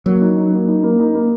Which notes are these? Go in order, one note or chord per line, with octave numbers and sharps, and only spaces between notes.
F#3 A#3
D#4
D#4
A#3
D#4
A#3
D#4
A#3